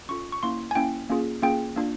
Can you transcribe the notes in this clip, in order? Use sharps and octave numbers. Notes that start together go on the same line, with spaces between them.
C#4 F4 A4 C#6
C#6
A#3 C#4 E4 C6
G#5
A#3 C#4 E4 G5
A#3 C#4 F4 G#4
A#3 C#4 F4 G#4 G5
A#3 D4 F4